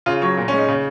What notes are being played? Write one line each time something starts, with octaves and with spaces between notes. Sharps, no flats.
C#3 F4
F#3 C#5
A#2 A#4
C#4
G#3
D#4
C#3